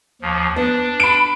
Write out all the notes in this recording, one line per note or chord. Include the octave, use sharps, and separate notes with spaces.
D#2 F3
B3 D4
B5 D7